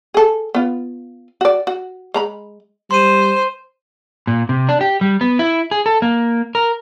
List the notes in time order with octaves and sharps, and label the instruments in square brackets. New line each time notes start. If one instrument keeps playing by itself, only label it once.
[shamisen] G#4 A4
B3 F4
F#4 D5
F#4
G#3 A#5 B5
[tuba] G3 [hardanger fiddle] C5 [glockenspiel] C6 D#7
[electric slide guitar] A#2
C3
D4
G4
G3
B3
E4
G#4
A4
A#3
A#4